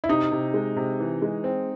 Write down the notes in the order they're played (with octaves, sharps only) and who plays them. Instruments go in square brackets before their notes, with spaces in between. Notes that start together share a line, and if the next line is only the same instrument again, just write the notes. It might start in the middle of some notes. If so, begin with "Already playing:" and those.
[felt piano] E4
[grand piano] C3 [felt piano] D#4
[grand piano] C3
G#3
C3
E3
G#3
C4